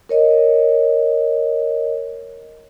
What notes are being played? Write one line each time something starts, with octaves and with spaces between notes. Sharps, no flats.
A#4 C#5 D#5